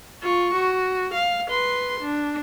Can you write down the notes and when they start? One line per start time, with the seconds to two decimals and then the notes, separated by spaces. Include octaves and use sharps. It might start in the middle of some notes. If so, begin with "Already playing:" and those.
0.23 F4 C#6
0.55 F#4
1.14 F5
1.50 B4 C6
2.01 D4